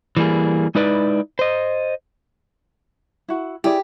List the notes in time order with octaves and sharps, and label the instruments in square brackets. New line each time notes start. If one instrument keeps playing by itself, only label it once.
[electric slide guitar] E3 G3 A#3 G#4
G#3 D#4 E4 B4 D5
C5 D#5
[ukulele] E4 F#4
[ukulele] E4 G#4 D5 [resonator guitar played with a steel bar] G4